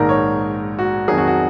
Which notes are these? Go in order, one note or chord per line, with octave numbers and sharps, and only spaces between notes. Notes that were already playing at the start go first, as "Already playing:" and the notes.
Already playing: A#1 G#2 D#3 A#4
C#5
F#4
F2 D#3 F#3 G#4
F#4
F#4